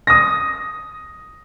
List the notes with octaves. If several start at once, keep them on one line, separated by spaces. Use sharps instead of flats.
D#6 A#6